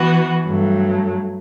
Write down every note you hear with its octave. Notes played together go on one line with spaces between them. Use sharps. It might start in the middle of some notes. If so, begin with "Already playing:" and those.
Already playing: E3 B3 F#4
G2 F#3 A3